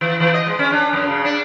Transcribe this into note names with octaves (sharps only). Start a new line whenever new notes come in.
E3
E3
D#5
G#3
C#4
D4
F#2
C#3
D4